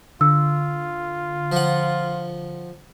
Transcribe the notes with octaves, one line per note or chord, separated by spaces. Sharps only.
D3 F4 E6
F3 F#5